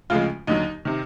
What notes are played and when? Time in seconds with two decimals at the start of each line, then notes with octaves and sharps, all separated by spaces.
0.10 D2 C#3 F3 G#3 F4
0.47 D#2 D3 F#3 D#4
0.85 C3 D#3